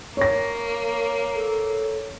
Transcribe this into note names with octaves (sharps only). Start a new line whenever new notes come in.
A#3 C#5 A#6
A4